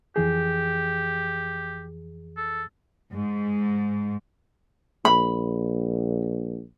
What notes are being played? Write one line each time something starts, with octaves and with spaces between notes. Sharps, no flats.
F2 E3 G4 G#4
A4
G#2
A#1 B5